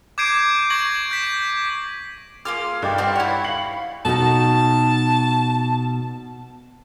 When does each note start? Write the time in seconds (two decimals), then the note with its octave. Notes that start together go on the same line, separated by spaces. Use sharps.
0.18 D6 G6 G#6 C7 D7 D#7
0.70 C#6 G#6 A#6 F#7
1.11 G6 B6
2.45 A#3 F4 G#4 D6 F6
2.82 G2 G3 A4 D#5 G5 A5 D6 A6
2.98 C4 F#5 F6
3.16 E4 F#4 C#5
3.44 F5 G5 B5 C7 C#7 F#7
4.05 B2 D#4 A5